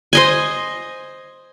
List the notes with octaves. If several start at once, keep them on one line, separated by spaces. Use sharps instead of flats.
C5 D#5 G#5